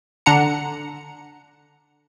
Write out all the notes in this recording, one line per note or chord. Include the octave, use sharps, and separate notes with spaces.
D3 D4 F#5 A#5 C#7